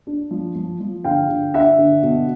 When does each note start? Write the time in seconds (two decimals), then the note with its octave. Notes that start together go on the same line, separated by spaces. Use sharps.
0.07 D4
0.31 F3
0.55 F3
0.80 F3
1.04 D3 F5 G5
1.29 D3
1.54 D4 E5 F#5
1.78 D3
2.02 B2